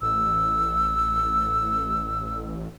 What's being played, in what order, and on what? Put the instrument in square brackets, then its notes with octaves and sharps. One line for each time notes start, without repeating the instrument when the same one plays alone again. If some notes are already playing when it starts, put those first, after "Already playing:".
[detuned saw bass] A1 [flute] E6